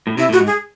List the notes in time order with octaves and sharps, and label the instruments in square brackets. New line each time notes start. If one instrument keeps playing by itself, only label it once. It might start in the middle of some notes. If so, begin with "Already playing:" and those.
[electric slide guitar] A2
[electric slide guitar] C3 [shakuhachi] E4
[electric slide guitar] A2
[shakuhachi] F#4
[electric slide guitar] G#2
[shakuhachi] G#4